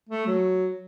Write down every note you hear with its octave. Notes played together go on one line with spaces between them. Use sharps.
A3
F#3